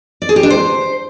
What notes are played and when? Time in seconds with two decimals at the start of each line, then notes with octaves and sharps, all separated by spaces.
0.22 D5
0.29 G#4
0.36 G4
0.43 D4
0.50 C5